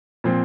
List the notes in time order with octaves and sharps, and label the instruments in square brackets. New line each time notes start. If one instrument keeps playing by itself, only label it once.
[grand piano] A#2 F3 C4